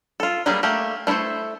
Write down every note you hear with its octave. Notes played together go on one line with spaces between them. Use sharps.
F4 A4
F#3 G3 A#3 B3 G#4
A3 A#3 G4
A3 D4 E4 A4 C5